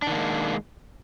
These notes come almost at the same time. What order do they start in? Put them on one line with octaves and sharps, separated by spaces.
D4 D#3 A#3 G#3